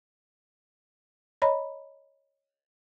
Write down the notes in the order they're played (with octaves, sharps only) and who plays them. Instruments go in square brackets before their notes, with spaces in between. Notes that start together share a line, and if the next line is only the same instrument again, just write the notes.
[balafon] C#5 D#5 A#5 B5